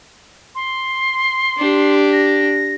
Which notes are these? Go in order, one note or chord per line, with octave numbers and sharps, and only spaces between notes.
C6
D4 G4
A#6